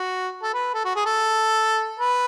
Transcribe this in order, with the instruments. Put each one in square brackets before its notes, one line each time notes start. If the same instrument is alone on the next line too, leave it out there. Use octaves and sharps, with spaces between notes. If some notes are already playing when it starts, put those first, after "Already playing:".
Already playing: [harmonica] F#4
A4
B4
A4
F#4
G#4
A4
B4